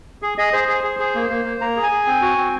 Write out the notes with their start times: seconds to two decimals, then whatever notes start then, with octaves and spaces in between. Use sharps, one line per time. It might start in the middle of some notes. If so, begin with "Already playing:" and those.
0.22 G#4
0.38 G#4 D#5
0.53 G#4 C5
0.68 G#4
0.84 G#4
0.99 G#4
1.15 A#3
1.30 A#3
1.45 A#3
1.61 A#3 A#5
1.76 G#4
1.83 G#5
1.91 G#4
2.07 C4
2.22 F#4
2.38 C4